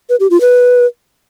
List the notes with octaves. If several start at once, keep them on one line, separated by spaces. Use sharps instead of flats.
B4
G4
F4
B4